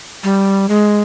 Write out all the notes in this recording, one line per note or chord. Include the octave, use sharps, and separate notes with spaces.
G3
G#3